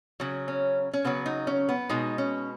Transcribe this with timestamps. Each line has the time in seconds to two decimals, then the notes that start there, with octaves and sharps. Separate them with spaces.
0.20 C#3 F#3
0.48 C#4
0.94 C#4
1.05 C#3 F#3 B3
1.26 D#4
1.47 C#4
1.69 B3
1.89 B2 G#3 D#4
2.18 C#4